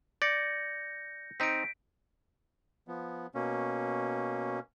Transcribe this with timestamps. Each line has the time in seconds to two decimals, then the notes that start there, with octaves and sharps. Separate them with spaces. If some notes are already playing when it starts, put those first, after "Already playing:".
0.22 D5 G6 A#6 C#7
1.40 C4 D#4 B6 D7
2.88 F3 B3
3.35 B2 A#3 C#4